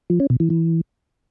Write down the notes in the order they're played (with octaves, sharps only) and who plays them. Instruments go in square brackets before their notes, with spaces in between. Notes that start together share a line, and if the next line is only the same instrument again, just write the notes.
[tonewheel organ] F3
C#4
B2
E3
E3